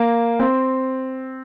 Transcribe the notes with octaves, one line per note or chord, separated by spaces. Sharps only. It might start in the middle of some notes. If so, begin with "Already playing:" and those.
Already playing: A#3
C4